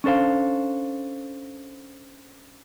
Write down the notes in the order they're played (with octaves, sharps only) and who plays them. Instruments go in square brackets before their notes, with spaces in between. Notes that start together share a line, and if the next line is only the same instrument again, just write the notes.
[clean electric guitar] C#4 D4 A4 C5 F5